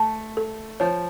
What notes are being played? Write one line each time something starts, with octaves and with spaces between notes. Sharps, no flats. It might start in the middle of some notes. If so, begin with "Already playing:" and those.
Already playing: A3 A5
A4
F3 C#5